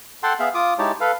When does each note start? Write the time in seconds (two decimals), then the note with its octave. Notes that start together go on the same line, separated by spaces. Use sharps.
0.23 A4 F#5 G5 A5 C6
0.39 B3 G#4 E5 F5
0.54 F4 D6 D#6
0.79 G#3 D#4 E4 G4 C#5 A5
1.00 A4 B4 F5